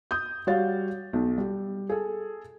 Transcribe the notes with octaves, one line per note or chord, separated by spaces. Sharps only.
D#6 G6
G3 F#4 C#5 F5 A6
B1
G3
G#4 A4